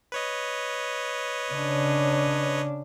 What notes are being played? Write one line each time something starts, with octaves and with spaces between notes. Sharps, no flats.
B4 C#5 D#5
C#3 D4